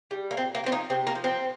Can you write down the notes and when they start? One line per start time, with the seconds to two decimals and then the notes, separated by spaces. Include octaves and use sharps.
0.11 G3
0.31 A#3
0.37 A#2 C4
0.55 A#3
0.64 F3 C4
0.72 A#3 D#4
0.90 C3 C4
1.07 A#3
1.15 F3
1.24 C4